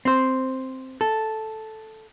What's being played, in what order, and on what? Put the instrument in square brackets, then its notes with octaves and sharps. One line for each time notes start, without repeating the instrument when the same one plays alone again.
[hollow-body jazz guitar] C4 C5
A4